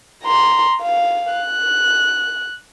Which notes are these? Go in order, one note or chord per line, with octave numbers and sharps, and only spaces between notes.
A#5 C6
F5
F#6